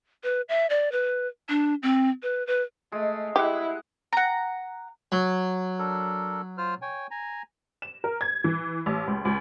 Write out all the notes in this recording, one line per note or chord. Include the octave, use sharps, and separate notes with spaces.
B4
E5
D5
B4
D4
C4
B4
B4
G#3 A3
G#3 E4 G4 F#5
F#5 A#5
F#3
D4 A4 A#4
F4 C5 F6
C#5 G5 G#5
G#5 A#5
E7
A#4
G#6
E3
A1
C#2
C#2